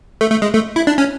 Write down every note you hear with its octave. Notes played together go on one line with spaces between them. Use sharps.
A3
A3
G#3
A3
E4
D4
C#4